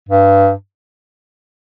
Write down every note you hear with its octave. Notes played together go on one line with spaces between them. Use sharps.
G2